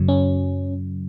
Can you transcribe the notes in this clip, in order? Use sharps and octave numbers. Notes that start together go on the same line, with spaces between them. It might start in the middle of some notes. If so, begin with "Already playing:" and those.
Already playing: F#2 C#3 F#3
C#4